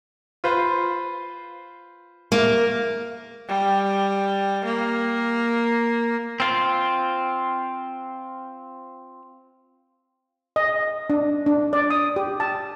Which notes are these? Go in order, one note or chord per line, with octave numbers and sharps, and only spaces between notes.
F4 B4 C5
A#3
G3
A#3
C4 F4
D#5
D4
D4
D5
D#6
G4
A5